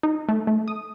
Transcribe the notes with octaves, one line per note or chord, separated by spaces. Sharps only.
D#4
A3
A3
D#6